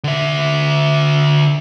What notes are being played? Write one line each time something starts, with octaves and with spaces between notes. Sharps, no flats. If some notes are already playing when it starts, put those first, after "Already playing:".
D3 E5